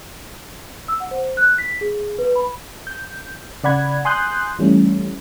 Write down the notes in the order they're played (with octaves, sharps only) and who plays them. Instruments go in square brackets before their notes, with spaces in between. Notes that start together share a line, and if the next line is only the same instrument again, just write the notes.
[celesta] E6
F#5
C5
F#6
B6
G#4
B4
B5
[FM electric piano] G6
C#3 D5 F#5 B5 G#6
G#5 C6 D#6 F#6 G6
E3 G3 A3 C#4